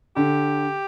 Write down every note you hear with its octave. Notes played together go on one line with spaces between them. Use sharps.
D3 G4